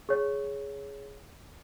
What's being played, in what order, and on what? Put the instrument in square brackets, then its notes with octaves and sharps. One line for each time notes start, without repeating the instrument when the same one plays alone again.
[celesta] G#4 C#5